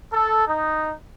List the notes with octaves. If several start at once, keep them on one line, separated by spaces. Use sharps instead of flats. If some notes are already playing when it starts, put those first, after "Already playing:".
A4
D#4